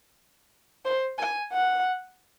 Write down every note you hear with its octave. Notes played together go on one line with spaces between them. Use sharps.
C5
G#5
F#5